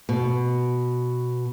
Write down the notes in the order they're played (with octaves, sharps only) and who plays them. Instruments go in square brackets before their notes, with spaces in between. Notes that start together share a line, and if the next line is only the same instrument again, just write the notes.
[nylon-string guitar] B2